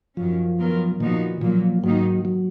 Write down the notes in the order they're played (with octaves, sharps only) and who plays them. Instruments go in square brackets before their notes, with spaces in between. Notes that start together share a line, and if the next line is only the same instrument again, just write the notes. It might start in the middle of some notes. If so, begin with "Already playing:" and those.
[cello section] F#2 D#3 F#3 C#4 [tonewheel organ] F3
[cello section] D#3 F#3 B3 F4 A#4
[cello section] A#2 F3 B3 D#4 F#4 [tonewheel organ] D#3
[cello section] A#2 F#3 A#3 [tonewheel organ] F3
[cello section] G#2 D#3 A#3 D#4 [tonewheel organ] F#3
[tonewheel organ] F#3